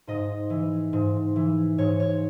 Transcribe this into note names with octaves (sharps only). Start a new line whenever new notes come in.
G#2 D#5
E3
G#2
E3
G#2 C#5
C#5